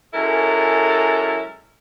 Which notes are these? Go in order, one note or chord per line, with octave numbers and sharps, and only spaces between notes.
F#2 G#3 E4 A4 A#4